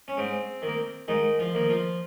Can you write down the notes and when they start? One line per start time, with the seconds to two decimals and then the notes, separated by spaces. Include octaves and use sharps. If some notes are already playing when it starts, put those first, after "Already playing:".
0.08 C#4
0.17 G#2 C4
0.62 D#3
0.67 A#3
1.08 G#2 D#3 D#4
1.39 F3 F4
1.54 D#3 A#3
1.69 F3 F4